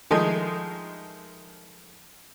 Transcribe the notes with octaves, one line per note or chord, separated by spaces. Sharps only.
D#3 F3 G#3 A3 D#5